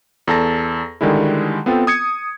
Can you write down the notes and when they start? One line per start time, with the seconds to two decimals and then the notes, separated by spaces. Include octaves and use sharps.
0.27 E2 A4 A5 A#6
1.01 D3 D#3 G3 G#3 E4
1.66 B3 C4 F4 A4 G5
1.87 D#6 G#6 C#7